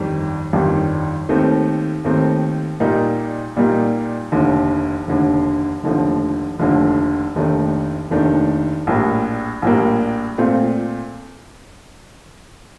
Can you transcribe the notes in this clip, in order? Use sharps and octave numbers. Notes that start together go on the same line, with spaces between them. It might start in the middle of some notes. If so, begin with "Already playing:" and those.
Already playing: G1 F2 D#3 G3
G1 F2 D#3 G3
D#2 D#3 A3 C4
D#2 D#3 A3 C4
A#2 G3 A#3 D#4
A#2 G3 A#3 D#4
F1 D#2 D3
F1 D#2 D3
F1 D#2 D3 F3 A3
F1 D#2 D3 F3 A3
F1 D#2 D#3 A3 D4
F1 D#2 D#3 A3 D4
A#1 A2 G3 A#3
A#1 A2 G3 A#3
A#2 A3 C4 F4